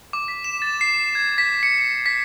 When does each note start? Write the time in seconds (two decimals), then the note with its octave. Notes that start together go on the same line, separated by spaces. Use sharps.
0.13 D6
0.28 B6
0.44 E7
0.62 A6
0.81 C7
1.15 G#6
1.38 B6
1.63 C#7
1.78 C#7
2.06 B6